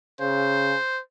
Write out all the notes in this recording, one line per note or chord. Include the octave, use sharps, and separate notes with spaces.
C#3 C5